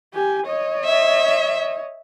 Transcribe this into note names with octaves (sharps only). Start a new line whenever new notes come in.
G4 G#5
C#5 D#5
E5